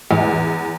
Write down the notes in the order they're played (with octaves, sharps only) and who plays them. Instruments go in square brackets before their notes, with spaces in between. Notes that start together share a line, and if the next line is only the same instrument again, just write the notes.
[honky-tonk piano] E2